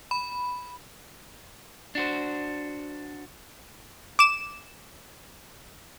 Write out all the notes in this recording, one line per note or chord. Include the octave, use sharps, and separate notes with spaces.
B5
D4 F#4 C5
D6 E7